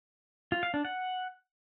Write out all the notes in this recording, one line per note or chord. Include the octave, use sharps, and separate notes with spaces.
F4
F5
D4
F#5